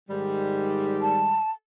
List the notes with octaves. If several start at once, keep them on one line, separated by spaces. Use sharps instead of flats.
G#2 D#3 G3
A5